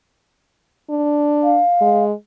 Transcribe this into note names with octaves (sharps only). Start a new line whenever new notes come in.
D4
F5
G#3